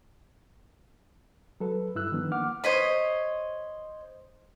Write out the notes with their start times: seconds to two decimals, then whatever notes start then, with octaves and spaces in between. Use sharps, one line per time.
1.60 F#3 A4 B4
1.95 G2 E4 E6 F#6
2.12 D#3 F3 B3 D4
2.32 A#3 F#5 D6 F6
2.64 C5 C#5 D#5 B5